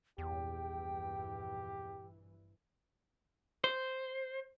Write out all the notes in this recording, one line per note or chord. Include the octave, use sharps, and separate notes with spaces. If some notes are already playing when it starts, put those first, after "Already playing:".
A#1 E2 G2 E3 G4 G5
C5